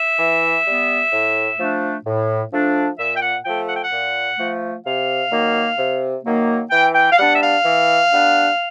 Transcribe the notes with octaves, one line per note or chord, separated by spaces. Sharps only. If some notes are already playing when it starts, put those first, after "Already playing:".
Already playing: E5
E3
G3 B3
A2
F3 A3 D4
A2
F3 A3 D4
A#2 E5
G5
F#5
F3 A3 G5
F#5
G5
F#5
A#2
F3 A3
C3 F5
D#3 F#3 A#3
C3
D#3 F#3 A#3
E3 G5
G5
F5
G3 B3 D4 F#5
E5
F5
E3
G3 B3 D4